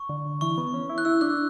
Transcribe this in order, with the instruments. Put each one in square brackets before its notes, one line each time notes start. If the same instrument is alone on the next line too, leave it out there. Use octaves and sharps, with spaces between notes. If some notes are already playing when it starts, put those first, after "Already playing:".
Already playing: [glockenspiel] C#6
[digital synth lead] D3
[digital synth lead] E3 [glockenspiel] C#6
[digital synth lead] B3
C#4
E4
[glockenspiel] F#6
[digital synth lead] E4 [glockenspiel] E6
[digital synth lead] D4 [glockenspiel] F#6